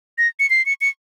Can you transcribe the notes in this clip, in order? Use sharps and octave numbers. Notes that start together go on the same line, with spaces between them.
A#6
C#7
C7
C#7
C#7